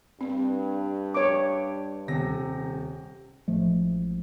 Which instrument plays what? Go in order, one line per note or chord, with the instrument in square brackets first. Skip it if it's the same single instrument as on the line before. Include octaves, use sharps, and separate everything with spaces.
[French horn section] G2 [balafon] C4
[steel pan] C#5 D6
[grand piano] D#1 C3 A#6
[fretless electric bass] A1 F3 G#3 A3